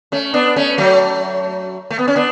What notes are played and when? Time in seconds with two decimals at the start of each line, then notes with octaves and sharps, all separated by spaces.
0.12 A3 C#4
0.34 B3 D4
0.56 A3 C#4
0.78 F#3 A3
1.90 A3
1.99 B3
2.08 C#4
2.16 B3 D4